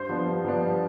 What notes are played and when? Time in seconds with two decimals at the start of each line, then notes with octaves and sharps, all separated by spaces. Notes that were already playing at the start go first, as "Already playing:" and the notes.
Already playing: G2 C5 C6
0.09 F3 B3 D4
0.27 G2
0.45 F3 B3 D4
0.62 G2